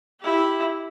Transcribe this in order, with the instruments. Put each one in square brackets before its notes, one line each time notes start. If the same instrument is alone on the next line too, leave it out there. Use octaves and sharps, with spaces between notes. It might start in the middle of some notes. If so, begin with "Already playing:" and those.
[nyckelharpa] E4 G4